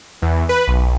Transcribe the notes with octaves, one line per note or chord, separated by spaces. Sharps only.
E2
B4
B1